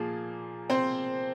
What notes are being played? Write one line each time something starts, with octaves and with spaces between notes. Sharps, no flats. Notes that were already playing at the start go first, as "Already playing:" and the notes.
Already playing: A#2 F3 A#3 G#4
C4 C5